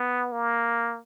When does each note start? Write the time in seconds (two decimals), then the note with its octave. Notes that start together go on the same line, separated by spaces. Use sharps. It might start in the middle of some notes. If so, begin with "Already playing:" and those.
Already playing: B3
0.32 A#3